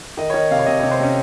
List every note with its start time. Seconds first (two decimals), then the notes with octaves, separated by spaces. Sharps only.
0.17 D#3 D#5
0.30 C#5
0.34 D#3 D#5
0.51 C3 F5
0.59 C#5
0.66 C3 D#5
0.80 C3 C#5
0.91 C5
1.00 C3 C#4